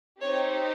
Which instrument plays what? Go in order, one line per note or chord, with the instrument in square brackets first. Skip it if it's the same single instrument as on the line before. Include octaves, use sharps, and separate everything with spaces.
[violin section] C4 D#4 G4 C#5